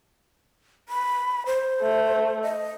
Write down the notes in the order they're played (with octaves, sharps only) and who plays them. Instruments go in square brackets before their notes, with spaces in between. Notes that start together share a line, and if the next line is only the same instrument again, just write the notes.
[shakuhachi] B5
C5
[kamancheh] A3
[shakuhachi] D#5